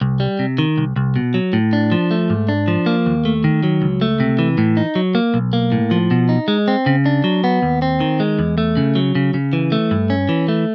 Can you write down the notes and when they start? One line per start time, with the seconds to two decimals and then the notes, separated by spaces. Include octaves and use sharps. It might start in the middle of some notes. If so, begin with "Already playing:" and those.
0.01 C2
0.20 G3
0.39 C3
0.58 D#3
0.78 C2
0.96 C2
1.16 B2
1.34 F#3
1.53 A2
1.73 D4
1.92 F3
2.11 A3
2.30 G#2
2.49 D4
2.68 F3
2.86 A#3
3.06 D#2
3.25 A3
3.44 D#3
3.63 F#3
3.82 C#2
4.01 A3
4.20 C3
4.39 E3
4.58 A2
4.77 D#4
4.96 F#3
5.15 A#3
5.34 B1
5.53 A#3
5.72 A2
5.91 F3
6.11 B2
6.29 D#4
6.48 G#3
6.68 C4
6.86 C#3
7.06 D4
7.24 F#3
7.44 B3
7.62 D#2
7.82 C4
8.00 D#3
8.20 G#3
8.39 E2
8.58 A3
8.77 C#3
8.95 F#3
9.15 C#3
9.34 C#3
9.53 E3
9.72 A3
9.91 G2
10.10 C#4
10.29 E3
10.48 A3